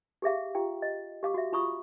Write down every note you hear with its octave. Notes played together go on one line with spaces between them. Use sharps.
G4 G#4 E5 F5
F4 G4 G5
D#5
G4 F5 D6
F#4 E5
F4 B5 C#6 D#6